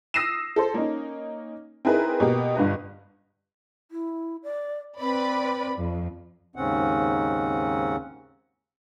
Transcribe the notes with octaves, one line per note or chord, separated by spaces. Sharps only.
D#6 E6 A#6 C7 D#7 E7
A4 C5
A#3 C#4 D#4
C4 D#4 E4 G#4 A#4 B4
B2 A#3 G4
G1 G2 B4 D#5
E4
D5
C4 B4 D5 B5
F2
D#2 G#2 C#3 C4 C#4 F#5